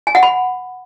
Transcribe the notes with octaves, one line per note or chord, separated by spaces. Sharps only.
G#5
F#5
B5